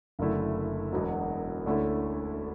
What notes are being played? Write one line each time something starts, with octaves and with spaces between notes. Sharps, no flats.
F#1 F#2 D3 A3 E4
E1 E2 B2 F#3 B3
D2 D3 A3 C#4 E4